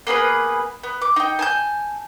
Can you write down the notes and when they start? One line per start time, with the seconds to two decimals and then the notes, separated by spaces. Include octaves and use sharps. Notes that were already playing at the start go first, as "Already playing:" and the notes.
0.07 A#3 B3 G#4 B4
0.84 B3
1.02 D6
1.16 D#4 G5
1.39 G#5 A5 G6